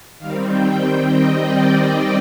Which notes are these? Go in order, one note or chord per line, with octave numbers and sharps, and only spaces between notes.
D#3 G3 C4 F5
G5
G5
D#5
D5